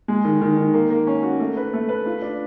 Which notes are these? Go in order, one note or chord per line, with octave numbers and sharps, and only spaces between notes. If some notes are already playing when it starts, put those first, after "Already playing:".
G#3
D#3
D#3
D#3
A#3
A#3
C#4
F#4
A3
B4
A3
B4
F4
D4